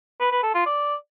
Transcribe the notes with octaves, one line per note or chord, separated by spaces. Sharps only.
B4
B4
A4
F4
D5